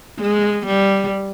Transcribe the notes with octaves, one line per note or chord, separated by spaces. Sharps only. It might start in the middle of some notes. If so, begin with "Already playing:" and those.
G#3
G3